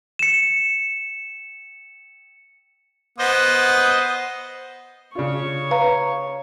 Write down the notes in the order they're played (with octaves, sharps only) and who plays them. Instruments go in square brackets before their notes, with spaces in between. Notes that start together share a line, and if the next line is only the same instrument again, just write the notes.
[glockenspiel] C#7 E7
[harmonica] B3 [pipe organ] C5 D#5
[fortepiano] C#3 D4 F4 [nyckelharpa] C#5 C#6
[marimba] B4 F5 A#5